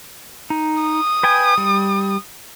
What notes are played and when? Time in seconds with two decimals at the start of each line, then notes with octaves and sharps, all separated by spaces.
0.50 D#4
0.82 D#6
1.23 B4 G5 G#5
1.58 G3